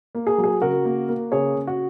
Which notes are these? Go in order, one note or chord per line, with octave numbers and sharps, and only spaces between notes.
A#3
G#4
F#3
G#4
C#3 F#4 A#4
A#3
A#3
C#3 G#4 C#5
C#3
F#4